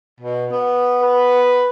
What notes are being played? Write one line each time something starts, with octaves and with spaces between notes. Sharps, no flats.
B2
B3
B4